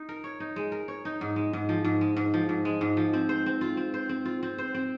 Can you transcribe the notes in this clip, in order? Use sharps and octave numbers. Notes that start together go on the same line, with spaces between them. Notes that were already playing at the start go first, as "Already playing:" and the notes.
Already playing: D#4
A#4
C#5
D#4
G#3
A#4
C#5
D#4
G#2
G#3
G#2
F3
G#2
G#3
G#2
F3
G#2
G#3
G#2
F3
C4
C5
C4
F4
C4
C5
C4
F4
C4
C5
C4